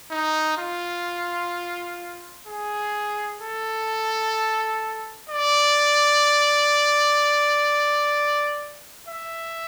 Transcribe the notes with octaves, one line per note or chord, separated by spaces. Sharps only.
D#4
F4
G#4
A4
D5
E5